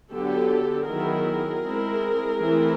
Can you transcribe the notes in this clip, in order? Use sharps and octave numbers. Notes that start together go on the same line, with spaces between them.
D3 F#3 B3 G4 A4
D#3 F#3 B3 E4 G#4 A#4
G#3 C4 E4
E3 A3 C4 E4